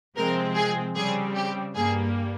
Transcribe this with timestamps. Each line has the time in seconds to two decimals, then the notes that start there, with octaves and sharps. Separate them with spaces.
0.17 C3 F3 G#3 C4 A#4
0.56 G#4
0.95 C#3 G3 C4 G#4
1.35 G4
1.75 G2 G3 A#3 G#4